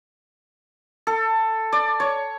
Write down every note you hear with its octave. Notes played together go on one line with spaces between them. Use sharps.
A4
D5
C#5